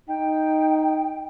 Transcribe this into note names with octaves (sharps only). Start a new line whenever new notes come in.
D#4 G5